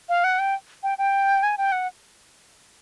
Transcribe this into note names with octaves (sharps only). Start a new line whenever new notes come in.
F5
F#5
G5
G5
G5
G#5
G5
F#5